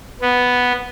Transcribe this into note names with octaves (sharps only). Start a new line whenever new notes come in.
B3